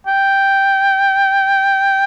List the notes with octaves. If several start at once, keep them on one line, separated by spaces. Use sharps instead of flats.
G5